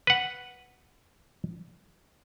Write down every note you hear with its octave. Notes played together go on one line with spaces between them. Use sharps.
B4 F#5